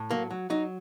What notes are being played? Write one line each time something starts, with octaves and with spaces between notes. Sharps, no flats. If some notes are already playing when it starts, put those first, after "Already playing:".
Already playing: A2
F#3 A#3
F#3
F#3 D#4